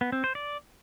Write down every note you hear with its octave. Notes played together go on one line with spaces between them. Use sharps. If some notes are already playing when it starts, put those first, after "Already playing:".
B3
C4
C5
D5